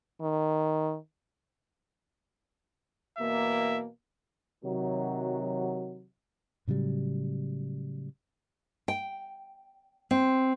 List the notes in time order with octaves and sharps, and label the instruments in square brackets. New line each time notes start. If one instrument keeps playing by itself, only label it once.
[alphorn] D#3
[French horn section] B2 E3 A#3 [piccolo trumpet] E5
[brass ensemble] C3 D#3 F#3
[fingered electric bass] A2 C#3 F#3 G3
[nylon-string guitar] G5
C4